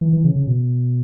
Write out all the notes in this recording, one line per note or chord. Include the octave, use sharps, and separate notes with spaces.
E3
E3
C#3
C#3
B2